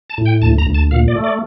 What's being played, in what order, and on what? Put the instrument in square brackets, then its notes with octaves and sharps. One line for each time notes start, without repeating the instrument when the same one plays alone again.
[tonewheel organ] A5
A2
G5
D2 A5
A#5
D2
A5
A#2 F5
D5
A3
D5